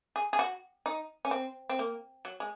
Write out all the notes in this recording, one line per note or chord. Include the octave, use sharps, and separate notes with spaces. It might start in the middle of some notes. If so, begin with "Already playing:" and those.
G#4
G#4
F#4
D#4
C#4
C4
C4
A#3
F#3
G#3